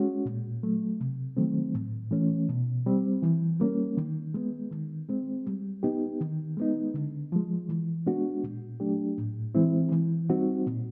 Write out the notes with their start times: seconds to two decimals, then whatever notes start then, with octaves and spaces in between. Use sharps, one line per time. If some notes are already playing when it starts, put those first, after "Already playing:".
Already playing: G#3 C#4 F#4
0.25 A#2
0.63 F#3 A3
1.00 C3
1.37 D#3 F#3 A3 C4
1.75 A2
2.11 E3 A3 C#4
2.49 B2
2.86 G3 C4
3.23 E3
3.60 G3 A#3 C#4
3.97 D#3
4.34 G#3 B3
4.71 D#3
5.09 G#3 C4
5.46 G3
5.83 B3 D#4 G4
6.21 D#3
6.57 G#3 B3 D#4
6.94 D3
7.32 F3 G#3
7.69 E3
8.07 G#3 B3 D4 F#4
8.43 A#2
8.80 F#3 A3 D4 G4
9.18 A2
9.55 E3 G#3 C4 E4
9.92 E3
10.30 G3 C4 D#4 F#4
10.66 A#2